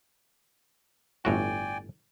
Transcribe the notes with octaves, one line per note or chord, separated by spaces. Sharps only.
G1 A2 F#4 D5 G5 G#5